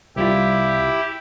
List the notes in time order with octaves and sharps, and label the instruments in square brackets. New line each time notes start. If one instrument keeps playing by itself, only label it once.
[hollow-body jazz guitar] C2 G3 F4 [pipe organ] E4 G4